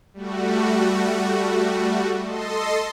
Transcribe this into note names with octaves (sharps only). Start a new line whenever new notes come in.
G3 A3 F#4
A4 D#5 C6